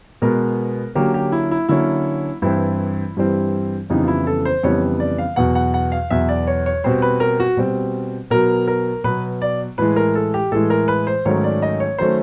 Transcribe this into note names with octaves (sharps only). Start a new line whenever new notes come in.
B2 G#3 B3 A#4
D3 F#3 A#3 C#4 G4
G4
E4
E4
D3 F#3 A#3 C#4 E4
G2 E3 G3 C4 E4
G2 E3 G3 C4
F2 C#3 E3 G3 B3 D#4
F4
E4
A4
C5
F2 C#3 E3 G3 B3 C#5
D5
F5
E2 B2 F#3 F#5
F#5
F#5
F5
E2 B2 F#3 E5
D5
C#5
C#5
B2 G3 C4 C5
B4
A#4
F#4
B2 G3 C4
B2 F#3 B3 A#4
A#4
B2 F#3 B3 B4
D5
A2 E3 G#3 B4
A#4
A4
G4
A2 E3 G#3 A4
A#4
B4
C5
G#2 D#3 F#3 A3 C#4 C#5
D5
D#5
C#5
D#3 F#3 A3 C#4 C5